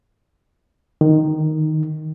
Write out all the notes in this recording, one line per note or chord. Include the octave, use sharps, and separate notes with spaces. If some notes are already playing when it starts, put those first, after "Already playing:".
D#3